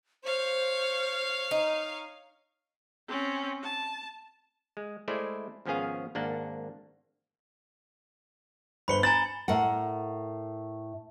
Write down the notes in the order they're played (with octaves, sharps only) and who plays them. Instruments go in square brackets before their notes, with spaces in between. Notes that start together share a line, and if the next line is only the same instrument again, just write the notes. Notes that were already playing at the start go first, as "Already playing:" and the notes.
[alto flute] C5 [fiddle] C#5 F5
[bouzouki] D#4
[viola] C4 C#4
A5
[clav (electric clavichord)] G#3
G#3 A3 E4 C5 D5
G#1 F3 B3 C#4 G#4 F5
G#1 A#3 D4 F#5
[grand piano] G1 B4 C5 [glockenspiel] B5 C#7 G7
[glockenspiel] G#5 A#5 F#7 [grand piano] A6
[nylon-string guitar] A2 A#4 F#5